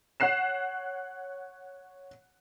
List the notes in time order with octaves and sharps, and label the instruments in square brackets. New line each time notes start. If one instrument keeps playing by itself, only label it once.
[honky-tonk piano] C#5 F#5 F#6 C7 E7